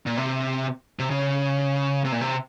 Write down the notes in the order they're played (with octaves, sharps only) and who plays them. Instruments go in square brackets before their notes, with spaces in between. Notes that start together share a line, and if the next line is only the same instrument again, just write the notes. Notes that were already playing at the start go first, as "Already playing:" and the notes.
[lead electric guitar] A#2
C3
C3
C#3
C3
A#2
C3